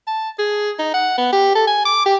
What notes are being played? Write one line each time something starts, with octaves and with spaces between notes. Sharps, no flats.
A5
G#4
D#4
F#5
B3
G4
A4
G#5
D6
G4